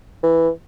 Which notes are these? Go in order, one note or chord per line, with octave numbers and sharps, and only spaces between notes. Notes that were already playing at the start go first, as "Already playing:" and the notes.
E3